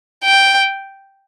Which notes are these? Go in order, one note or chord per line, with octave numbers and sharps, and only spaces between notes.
G5